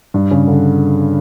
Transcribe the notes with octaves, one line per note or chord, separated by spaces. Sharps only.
G2
C#3
D3